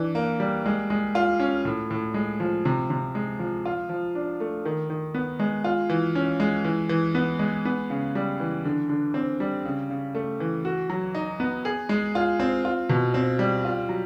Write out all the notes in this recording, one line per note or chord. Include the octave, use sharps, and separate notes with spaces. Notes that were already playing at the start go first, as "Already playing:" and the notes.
Already playing: E3 D4
A#3
G3
G#3
G#3
F4
C#4
A2
A2
G#3
F3
C3
C3
G#3
F3
F4
F3
D4
A3
D#3
D#3
B3
G#3
F4
E3
C#4
G#3
E3
E3
B3
G#3
B3
C#3
G3
E3
D3
D3
C4
G3
C#3
C#3
A3
E3
F#4
F#3
D#4
B3
G#4
G#3
F4
C4
F4
B2
C4
G3
F4
F#3